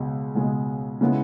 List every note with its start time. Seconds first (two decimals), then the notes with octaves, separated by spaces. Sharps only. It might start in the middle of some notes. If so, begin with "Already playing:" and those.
Already playing: C#2 B2 G#3
0.35 C#2 B2 G#3
1.01 C#3 G#3 B3 E4